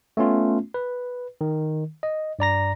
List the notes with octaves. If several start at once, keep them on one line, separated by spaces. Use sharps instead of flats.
A3 B3 C#4 F4
B4
D#3
D#5
G2 D5 A#5 A#6